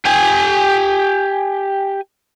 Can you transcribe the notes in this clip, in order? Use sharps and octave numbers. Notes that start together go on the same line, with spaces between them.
G4 G#5